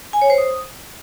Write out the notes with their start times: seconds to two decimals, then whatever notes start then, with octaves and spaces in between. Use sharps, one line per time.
0.13 G#5
0.22 C#5
0.30 C5
0.38 D#6